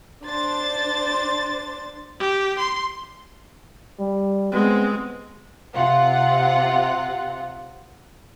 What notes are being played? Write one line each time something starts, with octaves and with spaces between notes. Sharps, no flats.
D4 C5 A6
G4
C6
G3
G#3 B3 C4
C3 F4 F#5